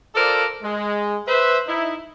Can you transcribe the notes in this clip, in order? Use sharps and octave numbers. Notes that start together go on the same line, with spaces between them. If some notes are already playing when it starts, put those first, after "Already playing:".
F4 A4 A#4 C5 D5
G#3
B4 C5 E5
D#4 E4